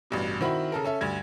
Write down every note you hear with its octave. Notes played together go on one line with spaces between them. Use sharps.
A1 G2 B2
D#3 C4 E4 F#4 B5
C#3 A4 A#4
C#4 A4 E5
D2 G2 G#6